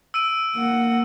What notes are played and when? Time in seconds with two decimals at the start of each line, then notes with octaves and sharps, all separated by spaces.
0.14 E6 D7 D#7
0.56 A#3 F#5